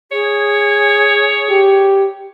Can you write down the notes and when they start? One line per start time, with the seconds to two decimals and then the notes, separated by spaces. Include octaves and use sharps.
0.12 G#4 C#5
1.50 G4